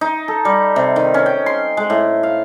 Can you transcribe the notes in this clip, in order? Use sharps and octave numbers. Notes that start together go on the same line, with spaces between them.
D#4
A4
G3
C3
D#3
C#4
G5
C6
G#3
A2
F5